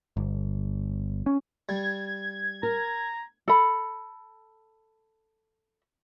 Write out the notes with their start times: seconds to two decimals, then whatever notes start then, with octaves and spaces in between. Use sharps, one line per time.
0.17 G1
1.26 C#4
1.69 G3 G#6
2.63 A#4 A#5
3.48 A4 B5